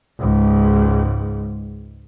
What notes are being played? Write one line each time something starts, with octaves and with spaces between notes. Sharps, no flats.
C#2 G#2